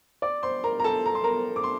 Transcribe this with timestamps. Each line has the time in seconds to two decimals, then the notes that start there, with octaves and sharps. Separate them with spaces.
0.22 D5 D6
0.43 C5 C6
0.64 A#4 A#5
0.79 A#5
0.84 A4 A5
1.06 A#5
1.15 C6
1.24 A#4 A#5
1.56 D6
1.64 C6